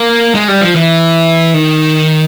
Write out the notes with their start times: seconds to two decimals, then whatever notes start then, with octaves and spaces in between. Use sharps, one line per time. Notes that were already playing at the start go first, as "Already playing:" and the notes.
Already playing: A#3
0.35 G#3
0.48 G3
0.61 F3
0.76 E3
1.54 D#3